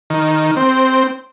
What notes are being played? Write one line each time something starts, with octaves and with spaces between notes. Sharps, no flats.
D#3
C4